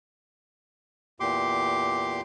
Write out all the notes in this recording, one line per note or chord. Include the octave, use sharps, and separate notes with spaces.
E2 A#2 G4 C6 D6